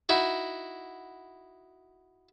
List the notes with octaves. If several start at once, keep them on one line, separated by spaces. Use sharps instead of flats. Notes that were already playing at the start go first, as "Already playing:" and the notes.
D#4 E4 F#4